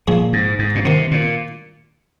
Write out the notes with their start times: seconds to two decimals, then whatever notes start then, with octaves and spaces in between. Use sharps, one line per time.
0.08 F2 A#2 F3 C4 G#4
0.33 G#2
0.59 G#2
0.75 A#2
0.85 D#2 C3 D#3 C4
1.11 A#2